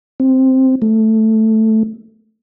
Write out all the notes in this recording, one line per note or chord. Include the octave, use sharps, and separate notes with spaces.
C4
A3